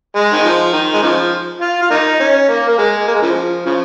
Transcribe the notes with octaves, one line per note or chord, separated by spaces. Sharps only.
G#3
D#3
F3
D#3
G#3
C#3 F3
F4
F4
A#3 D#4
C#4
A#3
A#3
G#3
A#3
G#3
C#3 F3
C#3 F3